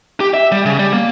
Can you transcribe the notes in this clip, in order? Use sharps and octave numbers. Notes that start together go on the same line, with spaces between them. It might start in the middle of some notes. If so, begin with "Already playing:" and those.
G4
E5
G3
C#3
G3
A#3